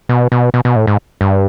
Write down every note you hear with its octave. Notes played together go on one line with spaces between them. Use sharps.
B2
B2
B2
B2
A2
G#2
G2